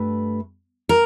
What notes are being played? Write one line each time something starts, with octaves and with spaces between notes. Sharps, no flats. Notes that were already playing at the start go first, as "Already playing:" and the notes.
Already playing: G2 A3 B4
A#4